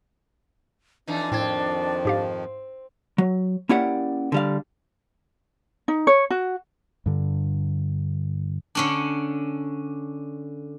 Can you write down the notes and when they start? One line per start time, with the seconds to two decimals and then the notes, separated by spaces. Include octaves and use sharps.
1.07 F2 E3 D4 D#4
1.32 F2 A2 D#3 F3 C4 G#6
2.05 G#2 G4 F5
3.18 F#3
3.69 A#3 C#4 E4 G4 D5 F#5
4.32 D3 G3 F5
5.88 D#4
6.07 C#5
6.30 F#4
7.06 G2 D3
8.75 D3 C#4 D4